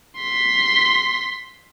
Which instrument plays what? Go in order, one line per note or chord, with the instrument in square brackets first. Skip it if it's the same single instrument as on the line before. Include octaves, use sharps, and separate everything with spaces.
[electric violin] C6 B6